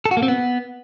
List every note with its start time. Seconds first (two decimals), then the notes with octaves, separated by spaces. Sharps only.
0.06 A4
0.11 F#4
0.17 A#3
0.23 C4
0.28 B3